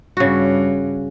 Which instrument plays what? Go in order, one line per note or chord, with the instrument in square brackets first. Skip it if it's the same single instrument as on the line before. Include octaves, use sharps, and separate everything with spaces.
[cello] G2 [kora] C#3 F#4